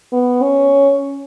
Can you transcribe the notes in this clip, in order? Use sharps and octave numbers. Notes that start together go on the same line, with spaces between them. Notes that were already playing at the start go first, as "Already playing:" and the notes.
B3
C#4